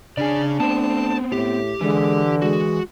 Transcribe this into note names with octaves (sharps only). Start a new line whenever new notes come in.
C#3 D4 G#4 D5
A3 B3 C4 A5
A2 G4
D3 E3 G#3
G#3 F#4